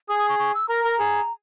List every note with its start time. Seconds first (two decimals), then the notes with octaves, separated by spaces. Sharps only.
0.09 G#4 D#6
0.19 D#6
0.29 C#6
0.39 C#6
0.54 E6
0.69 A#4 A#5
0.85 A#4
0.99 G#4